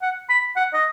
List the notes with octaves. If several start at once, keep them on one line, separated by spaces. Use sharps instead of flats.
F#5
B5
F#5
D#5